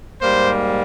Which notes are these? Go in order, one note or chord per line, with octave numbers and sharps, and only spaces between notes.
G#2 G3 A#3 C5